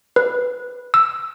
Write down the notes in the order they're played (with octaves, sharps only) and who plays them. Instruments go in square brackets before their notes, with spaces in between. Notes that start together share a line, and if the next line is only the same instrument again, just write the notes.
[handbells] B4
E6